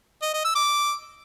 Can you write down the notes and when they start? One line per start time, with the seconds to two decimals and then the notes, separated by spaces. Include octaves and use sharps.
0.22 D#5
0.33 D#5
0.44 E6
0.55 D6